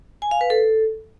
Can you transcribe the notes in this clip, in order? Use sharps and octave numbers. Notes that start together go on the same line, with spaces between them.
G#5
F5
B4
A4